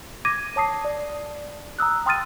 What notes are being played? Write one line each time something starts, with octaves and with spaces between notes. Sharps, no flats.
D6 G#6 A#6 D#7
C#5 A5 D#6 C7
D5
A#5 D#6 E6 F#6
G5 C6 D#6 F6 A6 D#7